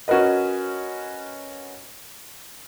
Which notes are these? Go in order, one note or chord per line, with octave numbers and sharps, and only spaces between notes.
C#4 F#4 A#4 B4 D#5